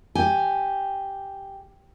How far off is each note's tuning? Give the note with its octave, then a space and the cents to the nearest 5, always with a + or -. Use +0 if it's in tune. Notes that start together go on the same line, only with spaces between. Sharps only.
G4 +0 G#5 +0